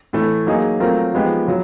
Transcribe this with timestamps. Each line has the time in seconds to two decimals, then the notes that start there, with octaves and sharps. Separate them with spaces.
0.13 A2 E3 A3
0.47 F#3 A#3 D#4 G#4
0.80 F#3 A3 C4 F4 A#4
1.14 F3 G#3 B3 D#4 G4
1.48 C#3 F#3